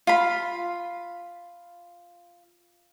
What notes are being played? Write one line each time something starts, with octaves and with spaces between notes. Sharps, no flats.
F4 B5